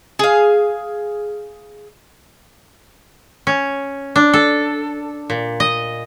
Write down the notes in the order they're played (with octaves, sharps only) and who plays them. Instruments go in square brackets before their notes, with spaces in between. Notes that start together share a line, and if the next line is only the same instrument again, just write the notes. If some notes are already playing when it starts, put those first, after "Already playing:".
[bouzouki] G#4 F5
[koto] C#4
D4
A4
A#2
D#5